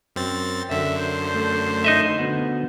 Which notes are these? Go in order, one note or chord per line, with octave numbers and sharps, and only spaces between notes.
F#2 C4 A6
F#2 D3 E5
C5
A3
D#4 D#5 E5
D3 B3 F#4